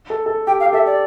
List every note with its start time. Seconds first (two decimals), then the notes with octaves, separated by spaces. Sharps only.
0.10 A4
0.26 A4
0.47 G4 G5
0.60 F5
0.66 G4
0.73 A4 E5
0.87 D5